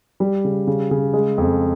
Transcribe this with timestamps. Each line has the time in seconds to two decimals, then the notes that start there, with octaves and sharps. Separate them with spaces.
0.20 G3
0.45 C#3
0.67 C#3
0.91 C#3
1.13 G#3
1.38 F2